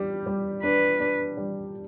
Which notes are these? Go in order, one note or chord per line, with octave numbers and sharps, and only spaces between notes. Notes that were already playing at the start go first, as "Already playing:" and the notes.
Already playing: G3 G4
G3
D4 B4
D4
G3